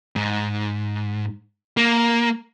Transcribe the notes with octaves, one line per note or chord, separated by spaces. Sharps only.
G#2
A#3